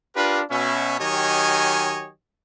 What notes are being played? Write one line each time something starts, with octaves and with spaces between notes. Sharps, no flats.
D4 F4 G4 A#4 B4
B2 C#4 E5
D#3 F#3 G4 C#5 D#5 G#5